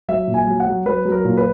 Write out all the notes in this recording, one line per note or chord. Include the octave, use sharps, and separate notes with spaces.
F#3 E5
A#2
G#5
F#3
F#5
F#3
F#3 B4
F#3
A#4
A#2
B4